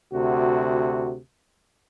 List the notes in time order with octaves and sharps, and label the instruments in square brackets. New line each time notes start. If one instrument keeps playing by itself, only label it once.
[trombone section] D2 C3 F#4